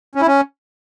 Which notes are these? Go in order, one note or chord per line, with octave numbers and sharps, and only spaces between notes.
C#4
E4
C#4